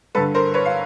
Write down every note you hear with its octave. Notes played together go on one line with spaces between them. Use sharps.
G2 D3 A4 B4
A#4 C5
B4 C#5
F5